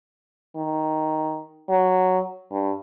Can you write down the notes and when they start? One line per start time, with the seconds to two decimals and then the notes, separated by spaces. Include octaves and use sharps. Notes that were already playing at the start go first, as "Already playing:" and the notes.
0.56 D#3
1.69 F#3
2.51 G2